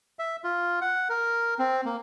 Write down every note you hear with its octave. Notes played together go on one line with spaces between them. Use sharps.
E5
F4
F#5
A#4
C4
A#3